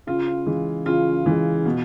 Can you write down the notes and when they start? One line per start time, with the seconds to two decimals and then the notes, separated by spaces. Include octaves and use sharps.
0.07 C#3 F4
0.46 E3 G#3
0.86 C#3 F4
1.26 E3 G#3
1.65 B2